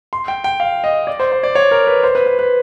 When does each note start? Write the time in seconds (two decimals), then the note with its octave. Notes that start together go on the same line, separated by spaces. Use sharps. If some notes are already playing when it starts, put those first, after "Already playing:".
0.13 C6
0.28 G5
0.44 G5
0.60 F5
0.84 D#5
1.07 D5
1.20 C5
1.32 C5
1.43 D5
1.55 C#5
1.71 A#4
1.87 B4
2.03 C5
2.15 B4
2.26 B4
2.39 B4